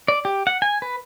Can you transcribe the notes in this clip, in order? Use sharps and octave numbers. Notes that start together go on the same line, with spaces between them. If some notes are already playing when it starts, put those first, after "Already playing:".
D5
G4
F#5
G#5
B4